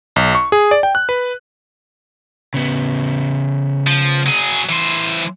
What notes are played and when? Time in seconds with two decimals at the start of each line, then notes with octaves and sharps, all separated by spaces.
0.16 B1
0.35 C#6
0.52 G#4
0.71 D5
0.83 G5
0.95 F#6
1.09 B4
2.54 C#3 B3
3.87 F3
4.27 F#3 G#4
4.69 E3 C5